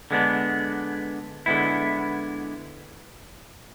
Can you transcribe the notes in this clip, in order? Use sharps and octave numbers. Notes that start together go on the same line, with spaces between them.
D3 G#3 B3 D4
D3 G#3 B3 E4